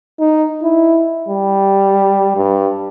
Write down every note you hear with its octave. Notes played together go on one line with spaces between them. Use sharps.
D#4
E4
G3
G2